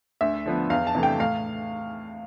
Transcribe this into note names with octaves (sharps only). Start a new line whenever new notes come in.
D2 E5
D3 F3 B3
E2 F5
A5
C3 E3 A3
G5
A2 F5